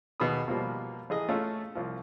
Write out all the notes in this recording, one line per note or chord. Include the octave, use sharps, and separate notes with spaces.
D#2 B2 B3 G#4 B5 D#6
B2 F3 G3 A#3
A1 G#4 D#5
A3 C#4 F4
C2 F3